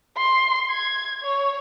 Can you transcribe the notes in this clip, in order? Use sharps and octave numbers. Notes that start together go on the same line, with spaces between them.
C6
G#6
C#5